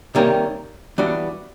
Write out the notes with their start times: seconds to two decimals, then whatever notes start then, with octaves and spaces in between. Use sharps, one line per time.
0.15 C3 D#3 G3 A#3 C#4
0.98 E3 G3 B3 D4 F#4